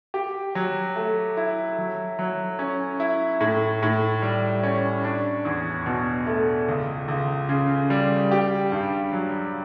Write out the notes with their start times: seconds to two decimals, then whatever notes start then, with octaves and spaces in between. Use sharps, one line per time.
0.14 G4
0.55 F#3
0.96 A3
1.37 E4
1.78 F#3
2.19 F#3
2.59 C#4
3.00 E4
3.40 A2
3.83 A2
4.22 G3
4.63 C#4
5.04 D4
5.45 E2
5.86 B2
6.27 A3
6.68 C#2
7.08 C#2
7.49 C#3
7.90 G3
8.32 G4
8.72 G2
9.13 F#3